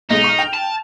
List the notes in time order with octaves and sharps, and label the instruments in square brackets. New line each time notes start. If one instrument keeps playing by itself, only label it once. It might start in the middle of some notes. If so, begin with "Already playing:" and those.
[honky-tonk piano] B1 G#3 [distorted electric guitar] D#4
[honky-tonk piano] C#6 F6
G5 F7
[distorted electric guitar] A5